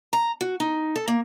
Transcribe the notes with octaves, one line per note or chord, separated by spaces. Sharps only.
A#5
F#4
D#4
A4
A#3